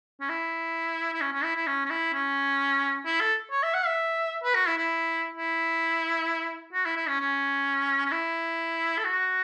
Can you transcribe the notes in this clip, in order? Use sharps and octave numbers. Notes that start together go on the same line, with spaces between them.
C#4
E4
E4
C#4
C#4
E4
E4
C#4
C#4
E4
C#4
E4
A4
C#5
E5
F#5
E5
B4
F#4
E4
E4
E4
F#4
E4
E4
C#4
C#4
C#4
E4
A4
F#4